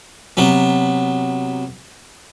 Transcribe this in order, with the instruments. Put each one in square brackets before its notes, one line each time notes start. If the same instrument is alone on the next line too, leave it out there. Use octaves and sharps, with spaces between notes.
[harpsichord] C3 F#3 B3